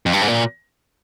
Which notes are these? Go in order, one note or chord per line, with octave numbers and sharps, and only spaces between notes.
F2
G2
G#2
A#2